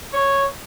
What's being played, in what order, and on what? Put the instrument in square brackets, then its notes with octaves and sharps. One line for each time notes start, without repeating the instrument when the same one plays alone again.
[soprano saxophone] C#5